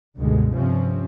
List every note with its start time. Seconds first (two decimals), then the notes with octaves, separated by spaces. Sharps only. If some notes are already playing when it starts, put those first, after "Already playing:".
0.16 C#2 G2 B2 D3 G#3
0.52 G2 C3 F3 C4 C#4